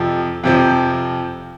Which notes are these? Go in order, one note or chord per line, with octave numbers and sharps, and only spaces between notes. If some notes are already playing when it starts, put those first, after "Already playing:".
Already playing: F2 C3 F3
F2 C3 F3